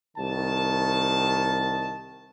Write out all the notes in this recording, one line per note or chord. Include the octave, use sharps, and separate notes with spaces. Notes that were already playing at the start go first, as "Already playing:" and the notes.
C2 D#3 A5